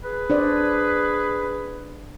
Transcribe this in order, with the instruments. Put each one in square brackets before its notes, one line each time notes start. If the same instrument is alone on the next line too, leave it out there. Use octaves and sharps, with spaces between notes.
[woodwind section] G#4 B4
[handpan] D4 C5 D5